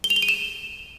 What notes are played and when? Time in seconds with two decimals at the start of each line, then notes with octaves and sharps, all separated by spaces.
0.04 G7
0.10 F7
0.16 G7
0.22 D#7
0.29 E7